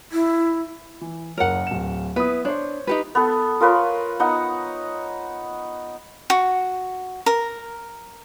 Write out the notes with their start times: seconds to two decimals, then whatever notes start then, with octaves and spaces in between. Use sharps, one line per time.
0.12 E4
1.01 E3
1.38 F#1 A#4 C#5 F#5
1.67 D1 E7
2.16 B3 E4 B4 D#6
2.45 D4 C5 C#5
2.87 D#4 G4 B4
3.15 B3 A4
3.60 F4 A#4 B4 C#5
4.19 B3 D#4 F#5
6.30 F#4
7.26 A#4